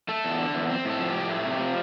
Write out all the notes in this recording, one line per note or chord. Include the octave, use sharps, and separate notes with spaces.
A3 A4
E2
D3
E2
C4
A2 A4
F3
G4
A2
A3
C3
F3